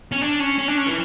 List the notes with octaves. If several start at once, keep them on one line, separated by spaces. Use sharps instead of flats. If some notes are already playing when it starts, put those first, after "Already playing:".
C#4
D4
C#4
C#4
D4
C#4
E3